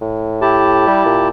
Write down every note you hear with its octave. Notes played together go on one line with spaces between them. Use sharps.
A2
E4 G4 A5
G3
A#2